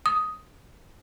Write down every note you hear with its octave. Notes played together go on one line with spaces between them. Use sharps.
D#6